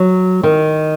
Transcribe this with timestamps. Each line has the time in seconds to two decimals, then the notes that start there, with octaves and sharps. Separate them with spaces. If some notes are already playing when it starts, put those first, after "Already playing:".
Already playing: F#3
0.43 D#3